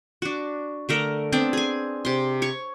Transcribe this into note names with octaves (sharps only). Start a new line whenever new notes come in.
D4 F#4
D3 A3 A#4
B3 C4 D4 D5
G#4 G#5
C3 C6
C#5 C#6